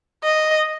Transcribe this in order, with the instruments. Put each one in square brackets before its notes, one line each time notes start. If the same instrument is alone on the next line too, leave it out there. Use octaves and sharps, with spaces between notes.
[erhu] D#5